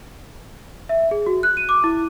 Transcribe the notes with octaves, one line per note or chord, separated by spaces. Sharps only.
E5
G#4
F#4
F#6
D#7
D6
E4